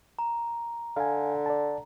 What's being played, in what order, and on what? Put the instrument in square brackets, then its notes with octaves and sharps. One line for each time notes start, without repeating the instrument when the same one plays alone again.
[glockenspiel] A#5
[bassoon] D3 [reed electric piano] F5 G#5
[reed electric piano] D5 A5